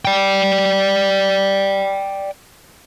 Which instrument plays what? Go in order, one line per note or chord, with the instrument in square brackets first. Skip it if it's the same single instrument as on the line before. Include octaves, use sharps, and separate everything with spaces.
[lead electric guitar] D5 G5